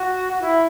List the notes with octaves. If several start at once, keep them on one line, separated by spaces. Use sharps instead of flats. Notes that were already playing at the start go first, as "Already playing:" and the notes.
Already playing: F#4
F#4
E4